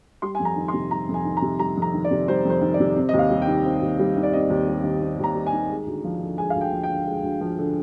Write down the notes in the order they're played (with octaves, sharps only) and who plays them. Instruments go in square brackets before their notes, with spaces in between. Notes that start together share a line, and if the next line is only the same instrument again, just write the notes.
[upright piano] G3 C6
F2 G#5
A#5
D#3
C6
C3
G3 A#5
F2
G#5
D#3
A#5
C3
G3 A#5
F2 A#5
D#3
D5
C3
G3 C5
F2
C5
D#3
D5
C3
C4
D#2 D#5
F5
G3
G5
D#3
C4
D#2
G3
D#3
D5
C4 D#5
D#2
G3
D#3
C4
D#2 A#5
G3
G#5
D#3
G#3
D2
F3
D3
G#3 G#5
D2 F5
G5
F3
G5
D3
G#3
D2
F3
D3